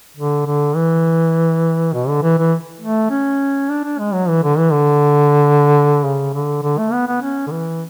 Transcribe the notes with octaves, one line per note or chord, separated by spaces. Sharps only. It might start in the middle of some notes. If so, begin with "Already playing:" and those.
D3
D3
E3
B2
D3
E3
E3
A3
C#4
D4
D4
G#3
F#3
E3
D3
E3
D3
C#3
D3
D3
A3
B3
B3
C#4
D3
E3